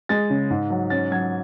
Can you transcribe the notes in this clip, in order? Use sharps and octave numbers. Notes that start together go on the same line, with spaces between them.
G#3 A6
C#3
G#2
F#3
C#4 A6
F#3 G#6